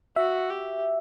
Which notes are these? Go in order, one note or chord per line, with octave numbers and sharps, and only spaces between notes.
F#4 E5
G4